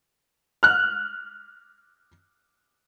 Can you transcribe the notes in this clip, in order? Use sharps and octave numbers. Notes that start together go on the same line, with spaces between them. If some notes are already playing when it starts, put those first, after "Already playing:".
F6 F#6